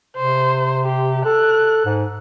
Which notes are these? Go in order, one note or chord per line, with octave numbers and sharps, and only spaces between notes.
C3 C5
G4
A4 F#6
G#2